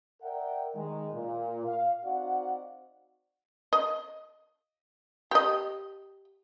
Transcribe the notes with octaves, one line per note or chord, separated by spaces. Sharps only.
A#4 D5 E5 F#5 G5
D#3 G#3
A#2
F5
C4 D#4 F#4 D5 F5 F#5
D#5
G4 D#5